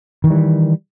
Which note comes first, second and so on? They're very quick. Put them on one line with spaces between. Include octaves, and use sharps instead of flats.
D#3 E3 G3